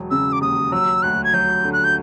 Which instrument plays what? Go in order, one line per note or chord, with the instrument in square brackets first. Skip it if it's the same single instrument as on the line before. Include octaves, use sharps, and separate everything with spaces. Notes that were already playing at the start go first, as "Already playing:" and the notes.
Already playing: [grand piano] E1 F#3
[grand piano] C#3 [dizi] E6
[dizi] D6
[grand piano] D#2 [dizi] D#6
[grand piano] F#3 [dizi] E6
[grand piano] D2 [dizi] F#6
[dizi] G#6
[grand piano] F#3 [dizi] G6
[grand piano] D3
[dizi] F#6
G6